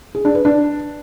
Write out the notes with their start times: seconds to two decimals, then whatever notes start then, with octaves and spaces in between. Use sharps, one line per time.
0.15 G#4
0.25 D4
0.35 B4
0.45 D4